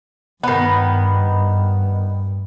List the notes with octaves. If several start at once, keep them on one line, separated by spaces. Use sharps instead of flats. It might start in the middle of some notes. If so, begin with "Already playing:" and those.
G2 D#3 B3